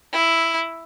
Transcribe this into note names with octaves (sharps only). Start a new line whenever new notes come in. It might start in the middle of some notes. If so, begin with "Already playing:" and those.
E4